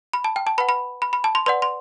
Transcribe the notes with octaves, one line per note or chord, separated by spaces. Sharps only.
B5
A5
G5
A5
B4 F#5 B5
B5
B5
B5
A5
C6
B4 D5 F#5 C6
C6